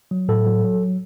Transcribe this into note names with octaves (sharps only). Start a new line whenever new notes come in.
F#3
A2 A4
F#3
F#3